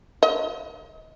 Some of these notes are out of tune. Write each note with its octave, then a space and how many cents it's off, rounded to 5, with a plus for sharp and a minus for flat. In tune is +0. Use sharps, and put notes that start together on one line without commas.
D#5 +25